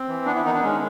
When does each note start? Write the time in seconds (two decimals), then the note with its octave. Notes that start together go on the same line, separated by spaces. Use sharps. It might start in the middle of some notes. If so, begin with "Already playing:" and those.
Already playing: C4
0.08 E3
0.26 B3 D4
0.35 E4
0.45 D#3 D#4
0.54 D4
0.63 G#3 C#4